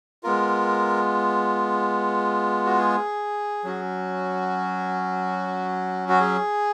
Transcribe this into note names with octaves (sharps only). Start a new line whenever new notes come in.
G#3 B3 F4 A#4
F#4
G#4
F#3 C#4 F#4
F#4
G#4